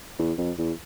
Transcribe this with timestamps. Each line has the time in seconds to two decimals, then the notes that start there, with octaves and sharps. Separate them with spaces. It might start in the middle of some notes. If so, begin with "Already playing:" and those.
0.19 E2
0.38 F2
0.58 E2